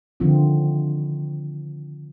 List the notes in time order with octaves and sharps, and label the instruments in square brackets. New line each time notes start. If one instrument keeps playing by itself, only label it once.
[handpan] D3 D#3 F3 C4 F4